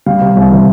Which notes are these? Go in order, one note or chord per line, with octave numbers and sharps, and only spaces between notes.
G3 F5
C3
C2
E3